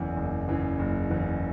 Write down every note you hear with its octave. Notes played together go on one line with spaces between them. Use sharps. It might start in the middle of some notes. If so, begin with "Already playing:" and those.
Already playing: F#1 E2 C#3 E3
F#1
E2 C#3 E3
F#1
E2 C#3 E3